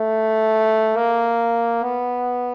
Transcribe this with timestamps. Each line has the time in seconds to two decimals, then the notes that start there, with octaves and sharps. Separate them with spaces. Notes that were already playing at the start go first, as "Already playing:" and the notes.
Already playing: A3
0.96 A#3
1.83 B3